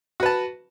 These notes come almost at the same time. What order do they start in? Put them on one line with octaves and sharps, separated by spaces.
F#4 B4 A5